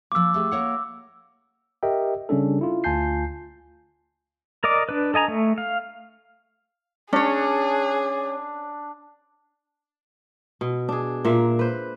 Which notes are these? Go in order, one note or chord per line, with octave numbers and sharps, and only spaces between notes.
F3 A#3 D6 E6
A3 G4 G#4
A#3 C#5 F#5
G4 A#4 D#5 E5 G5
C#3 G3 C#4 D4 A4
E4 F4
D2 F4 G#5 A5 G6 C7
A#4 D5 D#5 D6
D4 B4
A4 D#5 G#5 A#5
A3
F5
C#4 D4 G#4 C#5
B2
D4 G#4
A#2 A#3 E5
B4 C5